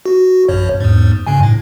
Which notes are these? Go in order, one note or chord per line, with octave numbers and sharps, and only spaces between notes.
F#4
A#1 F#2 C#5
E2 G#2
G2 C#3 G#5
A2